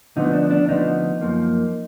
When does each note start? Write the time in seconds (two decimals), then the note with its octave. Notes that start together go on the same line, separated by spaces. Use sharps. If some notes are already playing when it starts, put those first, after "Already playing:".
0.16 D2 D3 F3 B3 D#4
0.33 D4
0.51 D4
0.68 D2 D3 F3 B3 D#4
1.21 F#2 F3 A#3